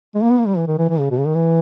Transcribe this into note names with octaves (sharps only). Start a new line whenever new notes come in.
G#3
A#3
B3
A#3
G3
E3
D#3
E3
E3
C#3
B2
C#3
D#3
E3